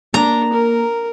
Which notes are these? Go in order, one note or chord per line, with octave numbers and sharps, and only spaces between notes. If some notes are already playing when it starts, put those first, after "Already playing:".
A#3 D4 A#5
A#4